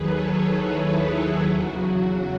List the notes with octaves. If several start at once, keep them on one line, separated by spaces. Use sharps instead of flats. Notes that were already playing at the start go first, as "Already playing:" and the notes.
Already playing: D#2 D#3 F#3 G#4 A4 B4 C#5
G#4 B4
E4 G#4
E2 C#3 F#3 F#4
F#4